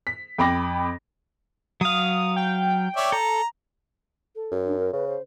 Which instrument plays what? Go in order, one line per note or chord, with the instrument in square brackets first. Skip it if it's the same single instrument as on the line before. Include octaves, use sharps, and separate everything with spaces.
[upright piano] B6
F2 G5 B5 D6 A#6
[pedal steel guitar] F#3 F5 [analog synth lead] D#6
[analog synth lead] G5
[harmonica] C#5 D5 E5
[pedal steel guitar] A4 [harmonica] A#5
[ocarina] A4
[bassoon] F#2
[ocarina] D4
A#4
[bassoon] C#3 [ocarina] B4
[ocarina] C5